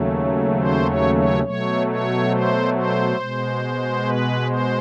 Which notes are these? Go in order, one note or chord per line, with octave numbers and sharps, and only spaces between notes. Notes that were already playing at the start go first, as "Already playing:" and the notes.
Already playing: D#2 C#3 F#3 A3
C5
C#5
C#5
B2 F#3 A3 C#5
C#5
C5
C5
B2 G#3
B4
C5